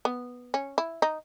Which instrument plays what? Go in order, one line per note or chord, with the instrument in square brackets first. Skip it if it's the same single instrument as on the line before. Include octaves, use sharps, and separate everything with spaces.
[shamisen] B3
C#4
E4
D#4